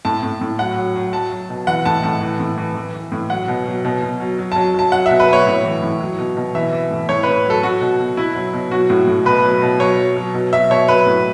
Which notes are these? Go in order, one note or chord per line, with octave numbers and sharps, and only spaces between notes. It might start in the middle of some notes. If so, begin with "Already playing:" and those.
A2 A5
A2
A2
F#3 F#5
F#3
F#3
F#3 A5
F#3
B2
E3 F#5
A2 A5
A2 A5
E3
A2
E3
E3
E3
A2
F#3 F#5
B2
F#3
B2
B2
F#3
F#3
A5
F#3
F#3 A5
F#3 F#5
E5
B2
B4
F#3 C#5
A2
E3
A2
F#3
B2
B2
E3 E5
E3
A2
A2 C#5
A2 B4
F#3 A4
F#3 F#4
B2
B2
B2 E4
F#3
B2
F#3 F#4
A2
A2
B2 B4
F#3
B2
F#3 C#5
F#3
F#3
B2
F#3 E5
B2 C#5
F#3 B4
A2